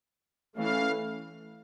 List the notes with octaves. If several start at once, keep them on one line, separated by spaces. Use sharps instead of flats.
E3 A3 C#4 F5